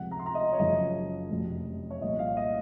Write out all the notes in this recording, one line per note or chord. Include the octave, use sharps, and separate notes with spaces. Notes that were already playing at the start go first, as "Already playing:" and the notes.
Already playing: C#2 C3 F3 F#5
A#5
C6
A#5
D#5
C#5
F#1 F#2 C#3 F3 D#5
F1 F2 C3 F#3
C#5
C2 A#2 F3 D#5
F5
D#5